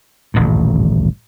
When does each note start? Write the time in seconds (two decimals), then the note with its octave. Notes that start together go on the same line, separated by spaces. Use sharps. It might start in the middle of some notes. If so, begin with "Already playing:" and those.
0.34 D#1 A1 D2 G2